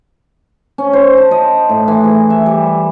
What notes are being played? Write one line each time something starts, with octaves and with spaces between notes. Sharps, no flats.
C#4
C5
A5
D#5
A2
E3
G#4
E5
G3